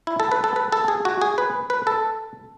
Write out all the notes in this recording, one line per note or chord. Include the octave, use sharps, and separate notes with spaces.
E4
A4
B4
A4
B4
A4
G#4
F#4
G#4
B4
B4
A4